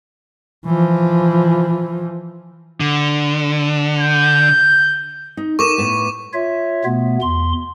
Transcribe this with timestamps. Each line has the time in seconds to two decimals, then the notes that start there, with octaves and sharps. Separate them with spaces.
0.65 E3 F3
2.80 D3
3.99 G6
5.37 D#4
5.59 D#4 A4 A#4 C#6 D6 E7
5.78 A2 B3
6.33 F4 C#5 E5
6.85 B2 A3 B3
7.21 E2 C6